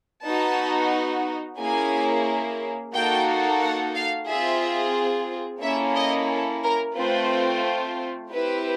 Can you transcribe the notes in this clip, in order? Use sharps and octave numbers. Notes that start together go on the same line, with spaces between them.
B3 D#4 F#4 A5
A#3 C#4 E4 G#4 G#5
A#3 D#4 F#4 A4 G5
F#5
F5
C4 F4 G#4 E5
A#3 C#4 E4 A4 E5
D#5
A4
A#4
A3 C4 F4 B4
C4 E4 G4 B4